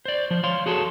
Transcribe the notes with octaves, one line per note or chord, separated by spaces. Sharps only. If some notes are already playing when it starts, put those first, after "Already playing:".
C5 D5
F3 C5
C#5 F5 C6
F#4 G#4 A4 C6